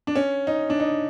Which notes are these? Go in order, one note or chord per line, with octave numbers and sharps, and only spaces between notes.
D4
C#4
D#4
D4
D#4